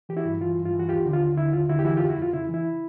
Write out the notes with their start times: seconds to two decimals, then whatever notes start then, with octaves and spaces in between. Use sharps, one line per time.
0.09 E3 G4
0.17 E4 F#4
0.25 G2
0.41 E3 F4
0.57 G2
0.65 F4
0.73 E3
0.79 F#4
0.89 D#2 F4 G4
1.06 D3
1.13 F4
1.21 D#2
1.37 D3 E4
1.53 D#2 F4
1.69 D3 E4 F#4
1.79 G4
1.85 E3 E4 F#4
1.97 F4 G4
2.01 F2
2.09 E4 F#4
2.17 F2 F4
2.34 C#3 E4
2.49 E3 E4